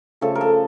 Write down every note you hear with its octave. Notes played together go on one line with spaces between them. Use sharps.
C#3 F3 A3 A4
A#4
A4